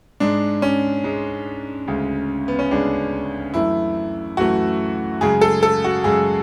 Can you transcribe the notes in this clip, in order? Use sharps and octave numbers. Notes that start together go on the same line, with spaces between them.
G#2 G#3 D4
C#4
G#2 G#3
D2 C#3 G#3
B3
C#4
D2 C#3 G#3 D4
F#2 E3 A3 E4
F#2 E3 A3 F#4
F#2 C#3 G#3 G#4
A4
A4
F#4
F#2 C#3 G#3 G#4